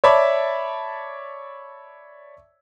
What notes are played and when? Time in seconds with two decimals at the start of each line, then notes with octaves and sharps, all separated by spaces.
0.04 C#5 D5 E5 A5 B5 D6